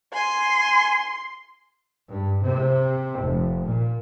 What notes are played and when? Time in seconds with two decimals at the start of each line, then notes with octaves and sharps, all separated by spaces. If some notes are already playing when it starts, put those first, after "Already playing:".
0.14 G#5 C6
2.11 G2
2.42 C3
3.21 F1
3.65 A#2